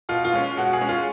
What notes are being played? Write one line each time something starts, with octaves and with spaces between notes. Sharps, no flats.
B2 F4
F4
G#3 C#4
B2 F#4
G#4
G#3 C#4
F4